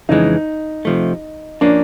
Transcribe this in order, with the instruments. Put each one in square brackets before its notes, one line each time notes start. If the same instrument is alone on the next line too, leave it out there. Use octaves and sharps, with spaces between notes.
[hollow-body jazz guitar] F2 C#3 E3 G#3 [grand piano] D#4
[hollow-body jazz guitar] C3 F3 A3
[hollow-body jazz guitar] F3 A#3 C#4 [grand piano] D4